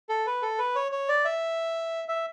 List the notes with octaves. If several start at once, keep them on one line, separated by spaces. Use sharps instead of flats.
A4
B4
A4
B4
C#5
C#5
D5
E5
E5